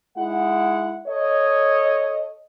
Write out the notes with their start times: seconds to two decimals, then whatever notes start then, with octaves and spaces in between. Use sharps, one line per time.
0.16 G#3 D#4 E4 F#5
1.07 A4 C#5 D#5